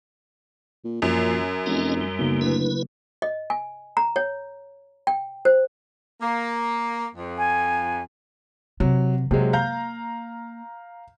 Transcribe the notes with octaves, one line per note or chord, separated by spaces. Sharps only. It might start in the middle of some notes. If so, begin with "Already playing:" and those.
A#2
F#2 A#2 F3
F1 C#4 F4 D#5
G3
B1 C#3 F#3 A#3
D2 E4 B4
D#5
G#5
A#5
C#5
G5
C5
A#3
F2
G#5
C3 F#3
C3 F#3 G#3 A#3
F5 A#5 G6